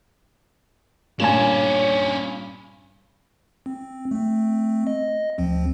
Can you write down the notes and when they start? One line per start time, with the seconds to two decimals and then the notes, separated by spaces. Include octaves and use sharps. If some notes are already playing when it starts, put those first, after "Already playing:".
1.20 G2 A#2 C#4 C#5 D5 G#5 E7
3.66 C4
4.11 A3 C4
4.87 D#5
5.38 D2 F3 C4